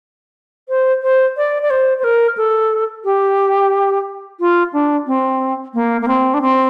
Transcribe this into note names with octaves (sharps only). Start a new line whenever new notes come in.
C5
C5
D5
D5
C5
C5
A#4
A4
G4
F4
D4
C4
A#3
A#3
C4
D4
C4